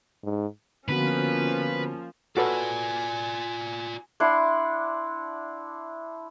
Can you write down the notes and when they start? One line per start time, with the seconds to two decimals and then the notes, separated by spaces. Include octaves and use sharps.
0.24 G#2
0.89 D3 F3 A#3 B3 C#4 F#4 B4
2.37 F4 F#4 A4 B4 D5 G#5
4.20 D4 E4 F#5 C6